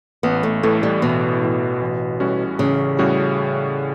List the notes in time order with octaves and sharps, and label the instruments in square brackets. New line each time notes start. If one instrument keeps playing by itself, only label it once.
[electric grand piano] A1 [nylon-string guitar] B3
[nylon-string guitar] A3
[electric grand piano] A2 E3 [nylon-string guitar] A3
[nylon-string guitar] G3
[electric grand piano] A1 [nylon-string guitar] B2
[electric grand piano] A2 E3
A1
A2 G3 C#4 F#4
[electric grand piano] A1 [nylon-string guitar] C#3
[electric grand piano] A2 G3 C#4 F#4